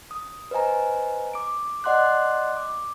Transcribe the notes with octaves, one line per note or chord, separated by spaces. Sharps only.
D#6
B4 C5 D#5 G#5 A#5
D6 D7
D5 D#5 F#5 C6 D6 F#6
D6